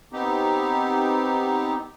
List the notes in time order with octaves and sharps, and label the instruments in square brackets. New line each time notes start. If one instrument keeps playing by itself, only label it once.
[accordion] B3 C4 D#4 G4